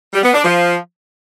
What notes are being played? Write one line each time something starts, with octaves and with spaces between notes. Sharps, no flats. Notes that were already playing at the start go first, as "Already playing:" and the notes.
G3
B3
D4
F3